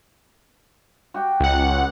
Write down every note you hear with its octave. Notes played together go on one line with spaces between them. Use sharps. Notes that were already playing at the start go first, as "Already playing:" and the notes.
F#4 G4 G5
C#2 F#5